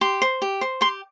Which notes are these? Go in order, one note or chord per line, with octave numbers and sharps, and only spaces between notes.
G4 C6
C5
G4
C5
G4 C6